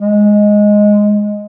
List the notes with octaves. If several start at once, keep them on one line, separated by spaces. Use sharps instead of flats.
G#3